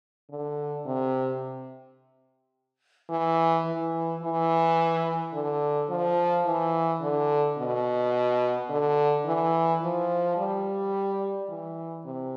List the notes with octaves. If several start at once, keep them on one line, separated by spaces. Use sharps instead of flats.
D3
C3
E3
E3
E3
D3
F3
E3
D3
B2
D3
E3
F3
G3
E3
C3